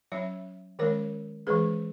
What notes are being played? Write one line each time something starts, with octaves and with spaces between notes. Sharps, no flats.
F#3 C#4 C#5 E5
D#3 G#3 C#4 A#4 C#5
E3 G#3 C#4 G#4 B4